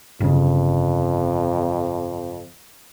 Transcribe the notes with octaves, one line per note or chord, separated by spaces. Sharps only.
G1 F2 C#3